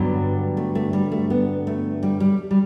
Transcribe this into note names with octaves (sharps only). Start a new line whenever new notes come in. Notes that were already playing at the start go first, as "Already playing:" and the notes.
Already playing: G2 D3 F#3 B3
A3
A3
G3
A3
B3
A3
G3
G3
G3